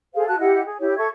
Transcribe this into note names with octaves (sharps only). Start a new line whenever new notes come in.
G#4 A4 C5 F5
F#4 A5 F#6
E4 G4 D#5 F#5
G#4
E4 G4 C#5
A4 E5 C#6 G#6